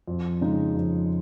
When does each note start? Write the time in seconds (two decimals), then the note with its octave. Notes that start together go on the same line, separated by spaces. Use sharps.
0.08 F2
0.41 C#3 G#3 D#4
0.75 F2